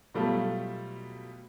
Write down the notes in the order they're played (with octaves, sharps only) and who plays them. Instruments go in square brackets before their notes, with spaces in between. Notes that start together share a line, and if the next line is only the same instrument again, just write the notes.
[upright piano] B2 F#3 G3 A3 F4 A4